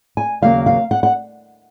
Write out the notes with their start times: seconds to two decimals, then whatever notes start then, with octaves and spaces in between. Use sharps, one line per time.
0.17 G#5
0.42 D#2 C#3 F#3 A#3 C#4 F5
0.66 F5
0.91 F#5
1.03 F#5